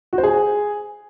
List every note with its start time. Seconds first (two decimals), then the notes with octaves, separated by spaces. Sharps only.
0.13 F#4
0.18 C5
0.23 G#4